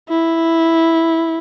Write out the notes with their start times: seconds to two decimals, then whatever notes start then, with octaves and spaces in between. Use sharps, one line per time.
0.09 E4